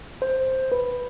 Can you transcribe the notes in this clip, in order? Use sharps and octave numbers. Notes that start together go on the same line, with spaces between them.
C5
B4